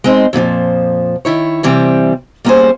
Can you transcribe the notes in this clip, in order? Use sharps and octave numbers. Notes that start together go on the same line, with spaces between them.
G#3 C4 D#4
F2 A#2 D3 F3
D#3 E4 C#5
C3 E3 G3 C4
G3 A#3 B3 C#4 G#4 C5